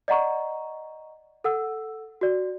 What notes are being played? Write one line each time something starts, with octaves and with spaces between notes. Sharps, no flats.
D5 D#5 F#5 A#5 C#6
A4 F#5 E6
F#4 D5